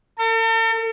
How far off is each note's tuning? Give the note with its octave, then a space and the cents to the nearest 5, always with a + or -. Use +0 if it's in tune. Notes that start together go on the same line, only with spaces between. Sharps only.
A4 +45